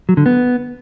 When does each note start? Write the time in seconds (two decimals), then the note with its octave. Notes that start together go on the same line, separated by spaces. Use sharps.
0.09 F#3
0.17 D3
0.26 B3